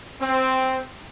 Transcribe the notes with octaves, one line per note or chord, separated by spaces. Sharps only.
C4